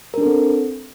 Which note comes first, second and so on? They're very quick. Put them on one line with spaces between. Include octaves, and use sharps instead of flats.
A#4 D4 A4 C4